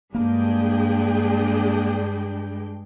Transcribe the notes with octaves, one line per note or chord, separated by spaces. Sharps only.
G2 G#3 A#3 D4 G#4 G5